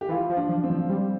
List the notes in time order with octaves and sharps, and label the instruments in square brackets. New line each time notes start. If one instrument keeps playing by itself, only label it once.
[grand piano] G4
[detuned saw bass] E3 [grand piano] F4
[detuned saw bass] F3
[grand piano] D4
[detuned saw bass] F3
[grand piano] C4
[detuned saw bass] F3
[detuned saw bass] G3 [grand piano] C4